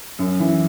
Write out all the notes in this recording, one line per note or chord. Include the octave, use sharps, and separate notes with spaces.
F#2
E3